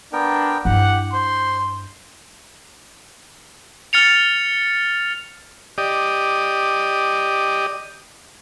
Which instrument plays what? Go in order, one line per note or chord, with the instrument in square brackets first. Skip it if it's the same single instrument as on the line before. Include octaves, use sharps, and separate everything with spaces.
[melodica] B3 A#4 G5 [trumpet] D4
[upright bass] G2 E4 [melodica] G4 [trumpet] F#5
[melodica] C5 [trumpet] C6
[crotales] F6 A6 C#7 F7
[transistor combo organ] G4 D5 D#5